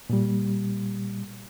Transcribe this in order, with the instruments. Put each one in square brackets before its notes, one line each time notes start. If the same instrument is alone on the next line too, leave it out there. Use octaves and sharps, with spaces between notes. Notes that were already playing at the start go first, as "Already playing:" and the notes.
[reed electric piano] A#2 G3